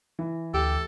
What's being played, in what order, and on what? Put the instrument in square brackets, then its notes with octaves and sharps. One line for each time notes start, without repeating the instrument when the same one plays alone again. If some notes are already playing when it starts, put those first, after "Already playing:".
[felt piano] E3
[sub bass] D2 [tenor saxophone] G4 [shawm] A4